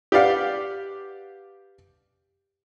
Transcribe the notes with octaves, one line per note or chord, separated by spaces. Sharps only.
G4 B4 D5 F5 F#5